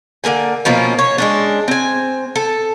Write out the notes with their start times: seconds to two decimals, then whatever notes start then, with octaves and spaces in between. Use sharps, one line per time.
0.24 D3 A#3 G#4 G#5
0.65 B2 F3 A#3 C#4
0.99 C#5
1.18 G#3 C#4 D4
1.68 C4 G#5
2.36 A4